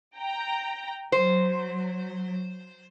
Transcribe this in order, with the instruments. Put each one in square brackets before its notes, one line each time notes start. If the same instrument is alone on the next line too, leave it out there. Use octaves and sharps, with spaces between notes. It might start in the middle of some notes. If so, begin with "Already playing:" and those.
[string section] G5 A#5
[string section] F#3 [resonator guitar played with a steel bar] C5